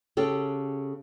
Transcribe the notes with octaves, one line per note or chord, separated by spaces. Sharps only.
C#3 G4 A4